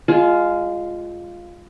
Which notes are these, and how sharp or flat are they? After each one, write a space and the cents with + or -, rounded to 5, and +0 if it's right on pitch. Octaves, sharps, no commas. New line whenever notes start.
G#3 -15 F4 +0 G#5 +35